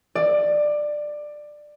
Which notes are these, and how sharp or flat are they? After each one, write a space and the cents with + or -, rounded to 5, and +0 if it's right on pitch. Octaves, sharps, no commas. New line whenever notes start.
D5 +15